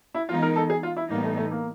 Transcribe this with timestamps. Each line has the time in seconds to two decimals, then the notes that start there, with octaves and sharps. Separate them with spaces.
0.14 E4
0.29 E3 G#3 B3 D#4 F4
0.42 A#4
0.56 A4
0.70 G#4
0.83 F4
0.96 E4
1.10 A2 E3 G3 A#3 B3 D#4
1.24 A3
1.37 A3
1.51 A#3